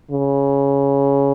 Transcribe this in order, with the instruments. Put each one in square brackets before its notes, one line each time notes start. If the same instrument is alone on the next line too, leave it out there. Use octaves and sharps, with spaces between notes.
[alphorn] C#3